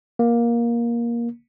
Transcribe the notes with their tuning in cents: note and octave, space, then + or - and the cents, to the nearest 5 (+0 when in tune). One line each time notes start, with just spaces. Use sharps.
A#3 +15